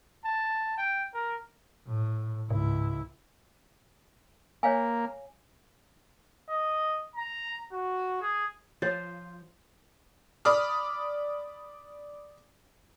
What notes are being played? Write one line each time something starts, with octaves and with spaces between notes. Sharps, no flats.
A5
G5
A#4
A2
C#2 G#2 E4
A#3 C#5 F5 G#5
D#5
A#5
F#4
G#4
F3 F4 C5 C#5
D5 B5 D6 D#6 F6